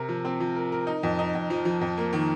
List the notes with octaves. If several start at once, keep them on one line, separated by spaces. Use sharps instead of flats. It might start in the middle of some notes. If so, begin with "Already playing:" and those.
Already playing: C3 A#4
F3
C4
F3
A#4
A#4
D#4
F2
D#4
F2
F3
F3
F2
A#3
D#3